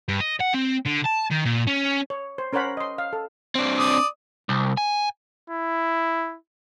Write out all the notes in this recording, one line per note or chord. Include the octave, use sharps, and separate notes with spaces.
G2
D#5
F#5
C4
D3
A5
D#3
A#2
C#4
C#5
C5
C#4 A#4 C5 C#5 F#5 B5
D#5 C6
F5
A4
C4 D4
D5 D#6
C2
G#5
E4